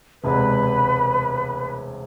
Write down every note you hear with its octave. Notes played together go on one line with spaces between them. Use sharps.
E1 D2 C3 G#3 D4 B4